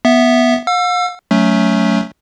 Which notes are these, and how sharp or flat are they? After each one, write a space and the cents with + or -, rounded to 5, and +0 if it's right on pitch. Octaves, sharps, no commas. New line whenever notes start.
B3 -10 E5 +0
F5 +45 E6 +30
F#3 +0 A3 +0 C#4 +15